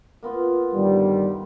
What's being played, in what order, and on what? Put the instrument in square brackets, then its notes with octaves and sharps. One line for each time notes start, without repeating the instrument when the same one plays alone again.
[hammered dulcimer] A#3 B3 F4
[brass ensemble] G1 D#3 G3